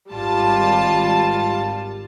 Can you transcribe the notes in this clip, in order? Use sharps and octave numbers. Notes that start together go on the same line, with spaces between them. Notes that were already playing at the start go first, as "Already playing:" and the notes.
G#1 G3 F4 A5